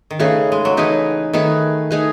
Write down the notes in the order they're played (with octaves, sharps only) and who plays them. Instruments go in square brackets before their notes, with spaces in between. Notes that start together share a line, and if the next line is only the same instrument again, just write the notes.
[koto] D#3
[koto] C#3 [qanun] A3 D#4 G#4 B4
[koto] G#3
F#3
[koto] E3 [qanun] A3 D#4 G#4 B4
[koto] D#3 [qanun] A3 D#4 G#4 B4
[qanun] A3 D#4 G#4 B4